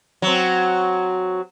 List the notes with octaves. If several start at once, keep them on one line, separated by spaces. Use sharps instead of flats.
F#3 C4